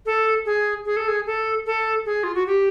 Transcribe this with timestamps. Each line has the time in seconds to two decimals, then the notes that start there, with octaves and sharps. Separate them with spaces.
0.06 A4
0.46 G#4
0.86 G#4
0.97 A4
1.08 G#4
1.26 A4
1.67 A4
2.06 G#4
2.24 F4
2.35 F#4
2.47 G4